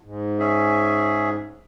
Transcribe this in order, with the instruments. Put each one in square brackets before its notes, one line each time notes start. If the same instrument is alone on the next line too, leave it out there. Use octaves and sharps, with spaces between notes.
[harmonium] G#2
[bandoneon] C#4 G#4 E5